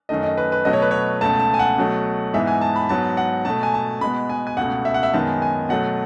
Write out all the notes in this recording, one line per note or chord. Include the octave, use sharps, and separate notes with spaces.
F#2 D#3 A3 D#5
D#5
B4
B4
B2 F#3 A3 D#5
C#5
B4
C#5
C#2 B2 A3 A5
A5
G#5
F#5
B2 F#3 A3
G#2 E3 G#3 B3 E5
G#5
A5
B5
G#2 F#3 B3 A5
F#5
B2 A3 A5
G#5
A5
B2 G#3 B3 B5
G#5
G#5
C#2 B2 A3 F#5
E5
F#5
E5
F#2 D#3 G#3 B3 A5
G#5
B2 F#3 A3 F#5